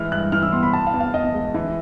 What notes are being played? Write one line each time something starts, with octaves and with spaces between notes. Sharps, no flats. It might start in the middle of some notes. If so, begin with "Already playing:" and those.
Already playing: E3 G#3 F6
G2 F#6
E3 F6
E6
B3 C6
B5
B2 A5
F5
E2
F5
E2 D#5
G#3
E3